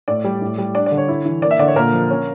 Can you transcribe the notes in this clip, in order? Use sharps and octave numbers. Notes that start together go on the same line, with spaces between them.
A2 D5
G3
A2
G3
D4 D5
D5
D3
C#5
E4
E3
A#3 D5
E5
D3 D5
C#5
A#2 A#4
F3
C#4